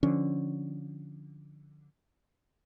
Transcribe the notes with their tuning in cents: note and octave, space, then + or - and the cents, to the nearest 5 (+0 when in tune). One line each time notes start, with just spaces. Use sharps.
D3 +5 F3 +5 C#4 +0